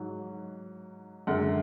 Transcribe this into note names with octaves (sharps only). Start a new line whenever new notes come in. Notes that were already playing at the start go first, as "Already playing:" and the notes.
Already playing: G#2 F#3
F#2 D3 G#3 F#5